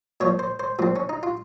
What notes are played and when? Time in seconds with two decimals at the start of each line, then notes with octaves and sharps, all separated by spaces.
0.20 A#2 F3 C#5
0.39 C5
0.60 C5
0.79 A#2 F3 C4
0.96 C#4
1.09 D#4
1.23 F4